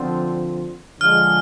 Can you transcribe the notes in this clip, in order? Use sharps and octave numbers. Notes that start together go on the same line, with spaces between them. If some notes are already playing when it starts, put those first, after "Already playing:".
Already playing: D3 F3 C4 F4
D3 F3 G#3 F6